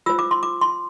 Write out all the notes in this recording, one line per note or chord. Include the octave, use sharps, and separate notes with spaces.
F4 C5 E6
D6
C6
D6
C6